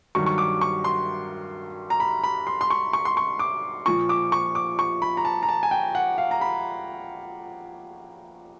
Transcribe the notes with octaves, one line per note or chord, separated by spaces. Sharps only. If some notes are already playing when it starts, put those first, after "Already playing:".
G2 D#3 F#3 C#6
C#6
D6
C#6
C6
A#5
B5
B5
C6
C6
C#6
C#6
C6
C#6
D6
A#2 F3 C#6
D6
C#6
D6
C#6
B5
A#5
A5
A#5
A5
G#5
G5
F#5
F5
A#5
B5